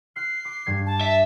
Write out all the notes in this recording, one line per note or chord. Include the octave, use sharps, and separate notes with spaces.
F6 F#6 C7
D6
G2 G3 G#6
A5
E5